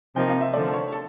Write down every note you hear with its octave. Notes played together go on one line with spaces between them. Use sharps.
C3 F3 A#3 D#4 G5
F5
E5
D3 F3 A3 D5
C#5
A4